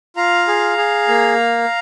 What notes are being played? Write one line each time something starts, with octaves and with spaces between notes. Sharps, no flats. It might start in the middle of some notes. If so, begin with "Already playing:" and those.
F4 F5 A#5
G#4
G#4
A#3